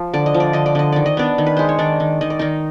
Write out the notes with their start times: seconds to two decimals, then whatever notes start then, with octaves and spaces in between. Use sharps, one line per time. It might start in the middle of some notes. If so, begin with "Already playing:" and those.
Already playing: F3
0.14 D3 D5
0.26 D#5
0.34 F3
0.40 D5
0.53 D3 D#5
0.66 D5
0.75 D3 D#5
0.92 D#3 D5
1.06 D#5
1.17 B3 D4 D5
1.38 D#3
1.46 B4
1.57 G#3 C5
1.69 C#5
1.79 D#3 D4 D5
2.00 D#3
2.21 D#3 D#5
2.30 D5
2.39 D#3 D#4 D#5